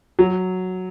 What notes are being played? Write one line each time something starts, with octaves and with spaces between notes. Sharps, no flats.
F#3